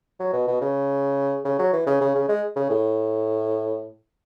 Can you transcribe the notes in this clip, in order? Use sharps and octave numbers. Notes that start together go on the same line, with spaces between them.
F#3
B2
B2
C#3
C#3
F#3
E3
C#3
C#3
C#3
G#3
C#3
A2